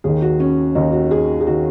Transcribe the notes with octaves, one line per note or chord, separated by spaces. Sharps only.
D#2 D#3 G#4
F#4
C#4
D#2 D#3 D#4
F#4
G#4
G#4
D#3 F#4